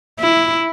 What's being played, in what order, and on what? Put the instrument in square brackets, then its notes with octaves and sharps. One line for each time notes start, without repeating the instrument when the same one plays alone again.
[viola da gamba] E4